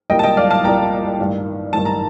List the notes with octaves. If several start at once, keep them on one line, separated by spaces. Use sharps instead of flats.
C2 A#2 G3 A#3 D#5 G5
A5
D#5 G5
D5 F5
F5 A5
C2 A#2 G3 A#3 G5 A#5
A1 G2 D#3
A1 G2 D#3 A5
A#5